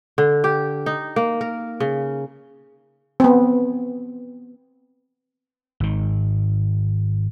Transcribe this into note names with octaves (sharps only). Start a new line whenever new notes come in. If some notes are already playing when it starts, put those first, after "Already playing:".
D3
G4
D#4
A#3
A#4
C#3
B3 C4
G#1 D#3